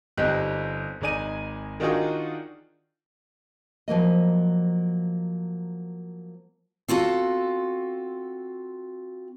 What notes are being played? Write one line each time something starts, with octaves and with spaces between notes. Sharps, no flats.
G1 C4 D#4 G4 D#5 F#6
G#1 G#3 D#4 D5 G#5 D#7
D#3 D4 D#4 F4 F#4 G#4
F3 F#3 A#3 D#5
C4 F4 F#4 A4